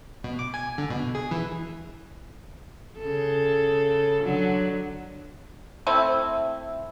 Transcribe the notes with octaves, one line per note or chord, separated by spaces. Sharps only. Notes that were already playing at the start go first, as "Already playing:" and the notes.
B2
D6
G#5
D3
B2
G#4
E3
C#3 A4
D3 F#3
A3 C4 E4